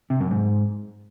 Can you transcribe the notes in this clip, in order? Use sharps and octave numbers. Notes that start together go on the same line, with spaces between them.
C3
F#2
G#2